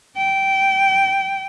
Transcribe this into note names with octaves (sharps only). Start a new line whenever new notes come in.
G5